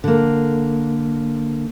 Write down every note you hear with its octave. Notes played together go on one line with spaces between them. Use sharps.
D3 A#3